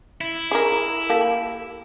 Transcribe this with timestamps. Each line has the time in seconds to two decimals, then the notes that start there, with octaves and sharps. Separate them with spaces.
0.21 E4
0.51 G#4 A#4
1.10 A#3 G4 A4